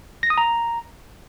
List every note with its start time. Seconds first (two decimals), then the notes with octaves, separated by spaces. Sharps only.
0.23 A#6
0.30 D#6
0.38 A#5